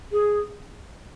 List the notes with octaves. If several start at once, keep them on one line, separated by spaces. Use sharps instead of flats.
G#4